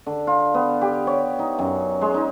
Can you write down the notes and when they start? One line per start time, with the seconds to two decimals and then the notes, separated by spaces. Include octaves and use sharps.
0.06 D3
0.27 F4
0.54 B3
0.82 G4
1.07 C#5
1.39 D#4
1.59 F#2
2.01 G#3
2.14 D#4